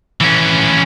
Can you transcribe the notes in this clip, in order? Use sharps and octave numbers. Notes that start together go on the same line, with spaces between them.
E3 C#4